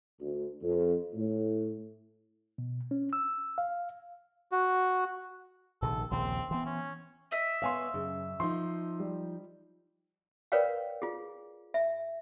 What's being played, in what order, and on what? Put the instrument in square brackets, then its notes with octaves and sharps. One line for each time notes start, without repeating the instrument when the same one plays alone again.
[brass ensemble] D2
F2
A2
[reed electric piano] B2
C#4
E6
F5
[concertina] F#4
[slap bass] A#1 C3 D#3 [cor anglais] A4
[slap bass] A#1 D#2 C#3 [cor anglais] C4
[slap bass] E3 B3 [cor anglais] C4
[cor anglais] C#4
[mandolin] D#5 E5
[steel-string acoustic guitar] B3 C#5 [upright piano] F5 G#5 C6
[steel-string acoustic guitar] F#2 [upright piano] C#3
[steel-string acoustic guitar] F3 D#4 [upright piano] C6
[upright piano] G3
[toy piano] A#4 B4 C#5 D5 F5 G5
F4 G#4
E5